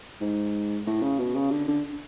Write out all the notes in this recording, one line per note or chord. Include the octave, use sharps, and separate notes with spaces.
G#2
A2
C#3
B2
C#3
D3
D3